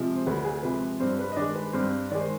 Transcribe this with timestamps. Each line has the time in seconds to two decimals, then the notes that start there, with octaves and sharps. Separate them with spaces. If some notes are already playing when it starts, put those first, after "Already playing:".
Already playing: C3 F3 G#3
0.16 C5
0.27 D2 B4
0.45 G#4
0.63 C3 F3 G#3 B4
1.00 G2 C4 C5
1.19 B4
1.32 D#5
1.36 D#3 G#3 D4 D5
1.56 B4
1.73 G2 C4 C5
2.11 D#3 G#3 D5
2.20 C5